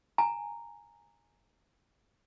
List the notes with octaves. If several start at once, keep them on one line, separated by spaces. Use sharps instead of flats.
G#5 A#5